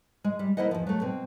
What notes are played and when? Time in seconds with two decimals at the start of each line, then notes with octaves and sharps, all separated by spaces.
0.24 G#3
0.39 G3
0.57 A#3 E4 F4 C5 D#5 F#5
0.71 E2 F3
0.87 F#3 A3
1.01 B2 C4